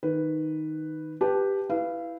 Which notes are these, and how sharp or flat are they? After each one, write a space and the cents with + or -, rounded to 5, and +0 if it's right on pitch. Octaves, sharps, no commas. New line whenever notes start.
D#3 +0 B4 +0
G4 +5 B4 +0 A5 -10
E4 +0 B4 +0 F5 -25